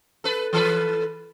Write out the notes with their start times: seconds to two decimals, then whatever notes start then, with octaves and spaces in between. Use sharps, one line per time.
0.24 A4 B4
0.53 E3 A4 B4